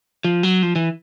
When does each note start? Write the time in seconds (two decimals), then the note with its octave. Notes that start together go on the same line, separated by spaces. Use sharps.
0.24 F3
0.43 F#3
0.63 F3
0.76 E3